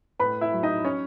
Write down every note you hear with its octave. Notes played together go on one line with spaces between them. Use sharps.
A2 B4 B5
E4 E5
F#3
D#4 D#5
C#4 C#5